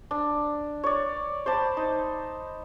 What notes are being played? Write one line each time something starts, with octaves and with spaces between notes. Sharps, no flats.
D4
C#5 D5
C5 D5 A5 B5
D#4